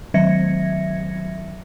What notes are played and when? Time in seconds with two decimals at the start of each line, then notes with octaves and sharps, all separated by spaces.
0.14 D#3 F#3 E5 G#6 A#6 C#7